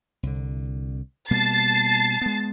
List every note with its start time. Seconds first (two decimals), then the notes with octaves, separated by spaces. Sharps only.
0.23 C2 D3
1.31 B2 G3 A#3 A5 A6 C7
2.21 G#3 B3